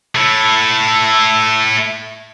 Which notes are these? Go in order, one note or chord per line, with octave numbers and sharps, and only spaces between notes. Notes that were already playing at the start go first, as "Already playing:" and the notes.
A3 E4